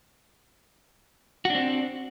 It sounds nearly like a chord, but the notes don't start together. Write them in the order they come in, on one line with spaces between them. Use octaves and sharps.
F#4 D4 C4